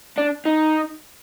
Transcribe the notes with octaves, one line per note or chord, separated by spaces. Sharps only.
D4
D#4